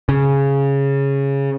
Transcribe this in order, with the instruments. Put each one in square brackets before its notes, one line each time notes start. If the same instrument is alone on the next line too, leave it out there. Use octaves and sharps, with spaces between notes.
[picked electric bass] C#3